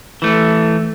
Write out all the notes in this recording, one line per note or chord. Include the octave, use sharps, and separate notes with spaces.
E3 A3